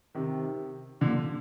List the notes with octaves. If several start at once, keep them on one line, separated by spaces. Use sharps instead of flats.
C3 D#3
A#2 D3